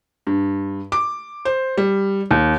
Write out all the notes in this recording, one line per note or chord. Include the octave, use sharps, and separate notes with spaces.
G2
D6
C5
G3
D#2